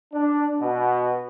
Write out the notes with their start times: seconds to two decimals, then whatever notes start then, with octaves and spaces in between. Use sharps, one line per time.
0.14 D4
0.61 B2